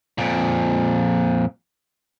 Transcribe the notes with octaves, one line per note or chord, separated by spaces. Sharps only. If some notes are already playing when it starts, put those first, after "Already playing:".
F2 A#2